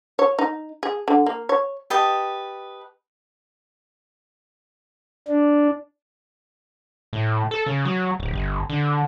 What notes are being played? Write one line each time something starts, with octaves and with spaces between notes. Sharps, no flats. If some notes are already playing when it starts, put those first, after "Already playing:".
C#5
D#4
G#4
D3
A#3
C#5
G4 B4 D#5 A5
D4
A2
A4
C#3
F#3
D1
G1
D3